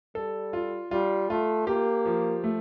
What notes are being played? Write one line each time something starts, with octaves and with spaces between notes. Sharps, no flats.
G3 A4
F4
G3 F4
A3 F4
A#3 G4
F3
A3